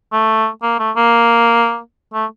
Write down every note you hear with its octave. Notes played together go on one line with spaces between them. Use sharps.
A3
A#3
A3
A#3
A3